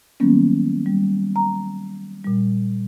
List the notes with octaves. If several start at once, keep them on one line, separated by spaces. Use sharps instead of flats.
D#3 F#3 G3 A#3 B3 C#4
G3
A#5
A#2 G3